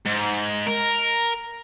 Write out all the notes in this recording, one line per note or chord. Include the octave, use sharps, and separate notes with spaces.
G#2
A#4